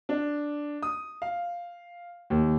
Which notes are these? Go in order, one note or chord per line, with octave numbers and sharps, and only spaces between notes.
D4
D#6
F5
D#2